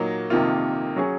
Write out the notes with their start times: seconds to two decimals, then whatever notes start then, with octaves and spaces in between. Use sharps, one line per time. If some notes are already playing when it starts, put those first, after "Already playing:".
Already playing: A#2 F#3 A#3 D#4
0.30 F2 C3 D#3 A#3 F4
0.96 F#3 C#4 G#4